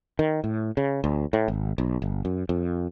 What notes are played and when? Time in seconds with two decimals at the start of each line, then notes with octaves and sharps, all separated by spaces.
0.19 D#3
0.44 A2
0.77 C#3
1.04 D2
1.33 A2
1.48 G#1
1.78 B1
2.02 G1
2.25 F#2
2.49 F2